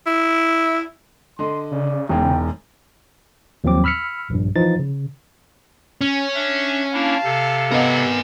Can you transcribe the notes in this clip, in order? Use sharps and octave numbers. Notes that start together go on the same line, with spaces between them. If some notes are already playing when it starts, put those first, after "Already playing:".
E4
D3 D#5 C6
C#3 D5
E1 E2 G#2 G5
D#2 F3 F#3 C4 D6
B5 E6 F6 B6 C#7
A#1 G2
E3 F3 D#4 A6
C#3
C#4
D4 E5
A#3 D4 E4 F5 A5
C3 A4
B3 A#4 D#5 F#5 G#5